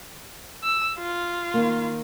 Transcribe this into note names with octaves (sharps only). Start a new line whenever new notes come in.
E6
F4
D#3 A#3